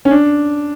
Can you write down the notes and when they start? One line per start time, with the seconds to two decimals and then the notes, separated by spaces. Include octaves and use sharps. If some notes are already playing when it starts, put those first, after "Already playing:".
0.05 C#4
0.11 D4